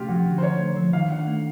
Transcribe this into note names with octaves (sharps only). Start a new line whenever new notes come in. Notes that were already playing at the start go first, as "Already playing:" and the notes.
Already playing: C3 A3 C#4 F4 G4
F3 F#4
D3
C5
D3 C#5
A3
F3
D#3 F5
D4 F#5
A3